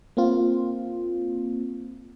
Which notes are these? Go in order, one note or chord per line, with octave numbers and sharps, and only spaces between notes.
A#3 C4 F4